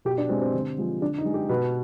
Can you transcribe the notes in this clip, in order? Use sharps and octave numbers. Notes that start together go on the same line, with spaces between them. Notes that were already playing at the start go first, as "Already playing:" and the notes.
B2 G4
D4
G#3 C4
C4
D3
F3 G#3
D3 D4
D#4
G#3
G4
B2 B4